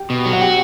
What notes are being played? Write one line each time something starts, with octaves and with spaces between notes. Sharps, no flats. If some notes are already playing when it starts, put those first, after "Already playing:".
Already playing: G4 G5
B2
F#3
F#5
F#4 G4 G5